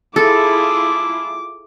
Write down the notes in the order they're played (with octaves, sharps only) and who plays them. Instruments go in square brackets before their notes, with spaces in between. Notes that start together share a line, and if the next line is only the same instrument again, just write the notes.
[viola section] E4 F4 G#4 [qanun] A4 [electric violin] D6